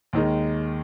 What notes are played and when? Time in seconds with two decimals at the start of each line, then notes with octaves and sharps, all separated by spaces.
0.13 D#2 D#3 G#3 D#4